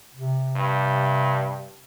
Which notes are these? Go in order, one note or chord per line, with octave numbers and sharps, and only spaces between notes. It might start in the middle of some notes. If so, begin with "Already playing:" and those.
C3
G2